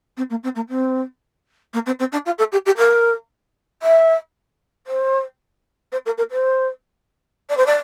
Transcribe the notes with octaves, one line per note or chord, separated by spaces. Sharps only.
C4
A#3
C4
A#3
C4
A#3
C4
C4
D4
F4
A4
G4
G4
A#4
E5
C5
C5
A#4
A#4
C5
D5
C5
D5